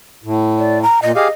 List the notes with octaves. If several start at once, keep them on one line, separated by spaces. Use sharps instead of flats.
A2
D5
A#5
A#2 D#5
G4 G#4 D#5 F5